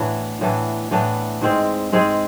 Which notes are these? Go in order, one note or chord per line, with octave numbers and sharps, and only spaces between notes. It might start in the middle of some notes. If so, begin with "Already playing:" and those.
Already playing: A2 E3 B3 D4
A2 E3 B3 D4
A2 E3 B3 D4
G#2 G#3 C4 G#4
G#2 G#3 C4 G#4